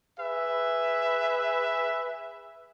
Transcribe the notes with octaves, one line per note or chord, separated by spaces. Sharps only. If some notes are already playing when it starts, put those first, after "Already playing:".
G#4 B4 E5